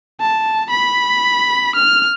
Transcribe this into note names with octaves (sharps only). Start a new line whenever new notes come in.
A5
B5
F6